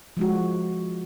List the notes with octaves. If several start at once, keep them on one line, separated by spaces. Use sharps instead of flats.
F3 G#3 F#4